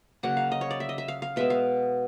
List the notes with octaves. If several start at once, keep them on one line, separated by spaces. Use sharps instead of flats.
C#3 F#3 A#3 F#5
F5
D#5
C#5
D5
E5
D#5
E5
F5
F5
B2 G#3 B3 E5
F5